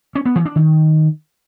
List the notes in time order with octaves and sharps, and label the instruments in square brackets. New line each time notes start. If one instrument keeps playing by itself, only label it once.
[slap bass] C#4
B3
E3
D4
D#3